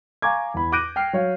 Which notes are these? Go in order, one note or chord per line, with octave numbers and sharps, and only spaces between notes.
F5 G#5 A#5 C#6 D6 G#6
E2 B5
D6 F#6 G6 A#6 D7 D#7
G5 F6 C7
F#3 C#5 F5